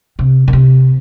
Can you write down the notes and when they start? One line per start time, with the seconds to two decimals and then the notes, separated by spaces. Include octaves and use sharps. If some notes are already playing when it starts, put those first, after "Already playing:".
0.19 C3
0.48 A#2
0.53 C3